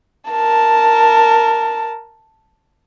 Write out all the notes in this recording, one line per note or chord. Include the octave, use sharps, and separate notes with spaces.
A#4 A5